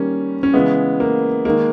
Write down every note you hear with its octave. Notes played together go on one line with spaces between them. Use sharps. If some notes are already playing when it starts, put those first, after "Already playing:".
Already playing: D#3 G3 A#3 C#4
C#4
C#3 E3 G#3 B3
A#3
D#3 G#3 A#3